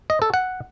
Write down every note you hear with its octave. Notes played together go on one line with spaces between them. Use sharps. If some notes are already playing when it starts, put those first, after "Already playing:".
D#5
A4
F#5